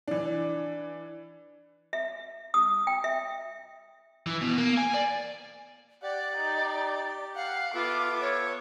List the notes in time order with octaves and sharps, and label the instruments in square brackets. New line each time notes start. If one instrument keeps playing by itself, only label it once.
[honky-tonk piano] E3 D4
[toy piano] E5
D#6
G5
E5
[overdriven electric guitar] E3
B2
A#3
G#5
D5
[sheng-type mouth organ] G4 [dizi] D5 [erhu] F#5
[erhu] D#4
[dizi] F5 [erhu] F#5
[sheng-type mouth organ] B3 A4 E5 [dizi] F4 [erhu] D6
[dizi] C#5